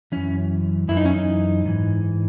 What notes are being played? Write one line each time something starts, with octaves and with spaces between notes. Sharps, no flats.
F#2 E3 C#4
F#2 E3 E4
D#4
C#4
D#4
G#2 E3